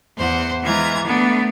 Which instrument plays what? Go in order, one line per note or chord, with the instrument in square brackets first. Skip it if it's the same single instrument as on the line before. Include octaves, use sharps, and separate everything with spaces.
[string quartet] E2 C5 F#5
E3 G#3 F4 A#5 G#6
A3 B3 D4